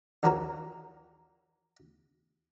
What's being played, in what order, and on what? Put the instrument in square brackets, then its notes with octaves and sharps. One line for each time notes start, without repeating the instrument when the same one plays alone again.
[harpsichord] A#1 D#2 F3 F#4 A#4 C#5